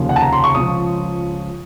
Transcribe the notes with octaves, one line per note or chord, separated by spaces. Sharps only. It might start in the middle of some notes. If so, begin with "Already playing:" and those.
Already playing: F1 D#2 C#3 F3
F#5
A5
A#5
C6
C#6
C#2 C#3 F3 D#6